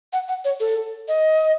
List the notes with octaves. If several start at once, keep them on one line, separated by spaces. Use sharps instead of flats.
F#5
F#5
C#5
A4
D#5